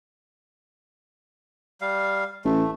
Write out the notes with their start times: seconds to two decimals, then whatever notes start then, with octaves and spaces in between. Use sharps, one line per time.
1.81 G3 F5
2.45 A1 A3